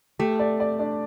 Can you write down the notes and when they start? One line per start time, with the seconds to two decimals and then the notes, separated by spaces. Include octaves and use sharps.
0.19 A3 G4
0.39 D5
0.60 D5
0.79 D4